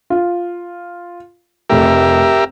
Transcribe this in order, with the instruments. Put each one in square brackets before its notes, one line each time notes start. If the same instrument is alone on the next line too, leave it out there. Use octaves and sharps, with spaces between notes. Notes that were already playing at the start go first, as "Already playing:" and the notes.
[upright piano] F4
[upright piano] F1 A3 [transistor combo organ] G4 A#4 E5